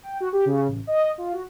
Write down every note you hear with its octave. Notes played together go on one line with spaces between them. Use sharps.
G5
F#4
G4
C#3
A1
D#5
F4
F#4